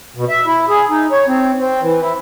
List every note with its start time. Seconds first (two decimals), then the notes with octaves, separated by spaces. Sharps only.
0.16 B2
0.30 E5
0.46 E4
0.69 G#4
0.90 D#4
1.11 C#5
1.28 C4
1.59 C4
1.82 E3
2.02 E4